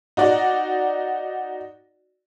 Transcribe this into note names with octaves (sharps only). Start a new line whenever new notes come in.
D#4 F#4 D5